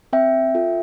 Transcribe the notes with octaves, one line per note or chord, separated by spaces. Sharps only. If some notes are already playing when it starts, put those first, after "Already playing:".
C4 E5 G5
F4 A4